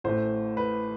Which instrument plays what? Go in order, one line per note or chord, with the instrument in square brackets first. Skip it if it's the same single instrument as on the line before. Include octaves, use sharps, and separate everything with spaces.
[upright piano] A1 A2 E3 A3 C5
B4